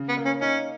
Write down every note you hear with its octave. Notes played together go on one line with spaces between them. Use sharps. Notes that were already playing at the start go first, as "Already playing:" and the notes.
Already playing: C#3
B3
A#3
C#4
C#4 D#4